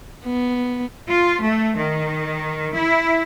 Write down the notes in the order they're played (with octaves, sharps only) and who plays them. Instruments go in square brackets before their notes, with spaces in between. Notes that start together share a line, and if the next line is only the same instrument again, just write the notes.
[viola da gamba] B3
[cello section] F4
A3
D#3
E4